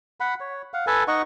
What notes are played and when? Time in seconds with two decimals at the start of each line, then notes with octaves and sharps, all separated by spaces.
0.20 F#5 B5
0.40 C#5
0.74 F5 F#5
0.87 A4 B4 G#5 A5
1.08 D#4 D#5 F#5 C#6